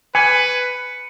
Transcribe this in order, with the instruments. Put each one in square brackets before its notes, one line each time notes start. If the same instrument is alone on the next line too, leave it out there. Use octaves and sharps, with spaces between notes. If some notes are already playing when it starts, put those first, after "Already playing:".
[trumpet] B4 [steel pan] G#5 [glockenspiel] C#7